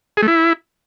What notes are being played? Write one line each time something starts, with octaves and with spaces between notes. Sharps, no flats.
G#4
A3
E4